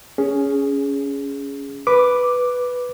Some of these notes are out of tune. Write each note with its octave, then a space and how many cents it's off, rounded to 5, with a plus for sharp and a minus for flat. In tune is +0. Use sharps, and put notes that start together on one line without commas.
C#4 +15 G#4 +0
B4 +0 D6 +0